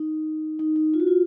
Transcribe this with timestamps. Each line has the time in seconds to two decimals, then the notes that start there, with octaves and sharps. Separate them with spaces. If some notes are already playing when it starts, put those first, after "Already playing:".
Already playing: D#4
0.59 D#4
0.76 D#4
0.94 F4
1.00 F#4
1.07 F4